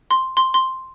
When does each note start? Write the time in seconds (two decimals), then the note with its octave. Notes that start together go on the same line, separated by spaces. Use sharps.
0.11 C6
0.37 C6
0.54 C6